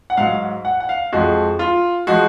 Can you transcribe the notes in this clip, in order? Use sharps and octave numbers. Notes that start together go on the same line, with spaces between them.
F#5
G#2 F#3 F5
F#5
F#5
F5
F2 F3 G#3 F#4
F4
F3 G#3 F#4